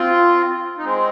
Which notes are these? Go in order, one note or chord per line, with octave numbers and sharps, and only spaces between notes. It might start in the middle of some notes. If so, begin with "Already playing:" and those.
Already playing: C4 F4
D#4
G#3 C4